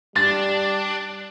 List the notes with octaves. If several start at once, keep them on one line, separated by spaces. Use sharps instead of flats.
G3 D4 A6